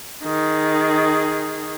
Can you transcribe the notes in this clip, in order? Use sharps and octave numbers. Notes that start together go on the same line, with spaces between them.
D#3 G#4